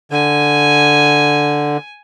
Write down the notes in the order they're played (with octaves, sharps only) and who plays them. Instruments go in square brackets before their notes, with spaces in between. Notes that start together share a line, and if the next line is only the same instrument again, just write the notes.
[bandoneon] D3 [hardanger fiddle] G#5